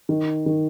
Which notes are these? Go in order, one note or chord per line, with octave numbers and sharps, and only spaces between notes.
D#3
D#3